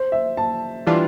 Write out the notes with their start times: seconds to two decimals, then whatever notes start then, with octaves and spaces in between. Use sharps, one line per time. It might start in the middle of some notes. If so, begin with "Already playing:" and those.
Already playing: C5
0.12 E5
0.37 A5
0.87 E3 G3 D4 F4